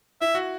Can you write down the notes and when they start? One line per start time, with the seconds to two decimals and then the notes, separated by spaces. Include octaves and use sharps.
0.21 E4 E5
0.35 F#4